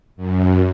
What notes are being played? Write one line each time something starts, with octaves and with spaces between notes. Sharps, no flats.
F#2